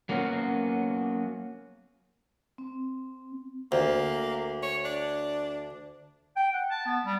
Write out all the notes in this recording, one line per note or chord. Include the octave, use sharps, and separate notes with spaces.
F#3 A#3 B3 C#4 F#4
C4
D2 A#3
C#5
D4
G5
F#5
A5
B3
G3